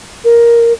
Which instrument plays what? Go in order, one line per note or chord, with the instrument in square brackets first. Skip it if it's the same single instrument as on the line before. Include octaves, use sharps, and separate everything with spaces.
[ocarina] A#4